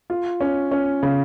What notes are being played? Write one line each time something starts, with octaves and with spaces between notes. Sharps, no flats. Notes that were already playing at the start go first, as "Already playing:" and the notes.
F4
C#4
C#4
C#3